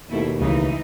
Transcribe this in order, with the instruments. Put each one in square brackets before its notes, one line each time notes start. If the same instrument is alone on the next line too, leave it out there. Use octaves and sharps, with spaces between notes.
[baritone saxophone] D#2 [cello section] B2 A3 E4
[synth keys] C#2 C#3 [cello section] E3 D#4